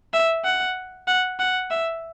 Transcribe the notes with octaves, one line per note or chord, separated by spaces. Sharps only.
E5
F#5
F#5
F#5
E5